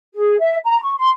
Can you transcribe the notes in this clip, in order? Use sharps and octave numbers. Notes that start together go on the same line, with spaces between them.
G#4
E5
A#5
C#6
C6